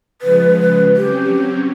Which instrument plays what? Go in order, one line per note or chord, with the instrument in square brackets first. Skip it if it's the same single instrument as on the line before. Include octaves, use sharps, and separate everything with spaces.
[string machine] C#3 F3 G#3 [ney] B4
[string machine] F#3 C4 C#4 [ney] G4